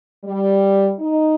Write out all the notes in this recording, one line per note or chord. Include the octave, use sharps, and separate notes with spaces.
G3
D#4